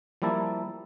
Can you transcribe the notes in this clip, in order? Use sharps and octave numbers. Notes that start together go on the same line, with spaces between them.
F3 G3 A#3 E4 A5